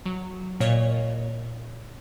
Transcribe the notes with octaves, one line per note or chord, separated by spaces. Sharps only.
F#3
A#2 C#5 D#5